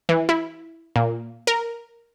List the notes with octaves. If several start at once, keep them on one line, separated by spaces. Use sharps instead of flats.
E3
E4
A#2
A#4